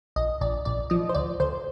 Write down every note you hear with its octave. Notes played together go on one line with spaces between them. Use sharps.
A#1 D#5
A#1 D5
A#1 D5
F3 D#5
C5
D2 D5
D2 C5